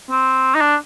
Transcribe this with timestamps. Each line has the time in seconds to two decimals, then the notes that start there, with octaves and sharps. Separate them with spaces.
0.10 C4
0.55 D#4
0.61 D4